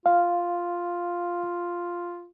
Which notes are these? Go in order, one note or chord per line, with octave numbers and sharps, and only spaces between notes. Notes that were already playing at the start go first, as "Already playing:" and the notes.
F4 F5